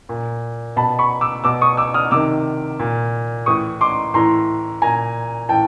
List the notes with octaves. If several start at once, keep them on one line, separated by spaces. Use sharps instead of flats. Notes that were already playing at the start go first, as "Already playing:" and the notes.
A#2
B2 A5 B5
B5 C#6
D6 E6
B2 D6 E6
C#6 D#6
D6 E6
D#6 F6
C3 D#3 D6 E6
A#2
A2 E3 C#6 D#6
C6 D6
A2 E3 A#5 C6
A#2 G#5 A#5
A2 E3 G5 A5